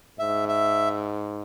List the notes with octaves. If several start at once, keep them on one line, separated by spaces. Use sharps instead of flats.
G#2 E5
E5